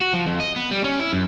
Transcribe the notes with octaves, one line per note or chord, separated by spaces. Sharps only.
F#4
F3
F2
D#5
B3
G3
C#4
E4
F#2